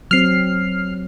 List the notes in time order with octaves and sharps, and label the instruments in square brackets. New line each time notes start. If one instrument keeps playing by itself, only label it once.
[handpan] F#3 C4 [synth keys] F6 C7